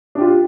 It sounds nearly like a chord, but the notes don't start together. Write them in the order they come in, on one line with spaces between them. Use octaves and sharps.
D4 G4 F4